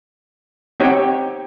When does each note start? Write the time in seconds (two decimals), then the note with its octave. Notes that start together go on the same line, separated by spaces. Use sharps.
0.80 C4 D#4 G4 C#5 F#5 G5